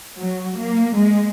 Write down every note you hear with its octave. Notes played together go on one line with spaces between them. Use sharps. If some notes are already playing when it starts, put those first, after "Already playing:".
F#3
A#3
G#3